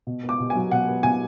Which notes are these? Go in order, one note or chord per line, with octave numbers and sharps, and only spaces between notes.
B2
B3
D6
B2
G#5
F#3
B2 F#5
B3
B2 G#5